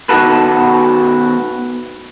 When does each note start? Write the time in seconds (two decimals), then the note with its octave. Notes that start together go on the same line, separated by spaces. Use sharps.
0.09 B2 D#3 F3 F#4 A4 B4